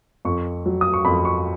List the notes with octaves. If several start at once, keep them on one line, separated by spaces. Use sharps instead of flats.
F2 C#6
F#3
D#6
C#6
F2 B5
C#6